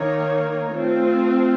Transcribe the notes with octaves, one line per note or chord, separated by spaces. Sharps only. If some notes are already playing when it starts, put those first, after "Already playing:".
Already playing: D#3 A#3 D#4 A#4 C#5
A3 C4 F4